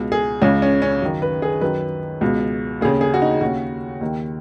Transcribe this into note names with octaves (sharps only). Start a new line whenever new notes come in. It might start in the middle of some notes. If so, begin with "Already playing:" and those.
Already playing: C#2 B2
G#4
C#2 C#3 C#4
C#4
C#4
F#2 D#3
B4
G#4
F#2 D#3 B4
C#2 B2
D#2 C#3 G#4
G#4
F#4
D#4
D#2 C#3 F#4
D#2 D#3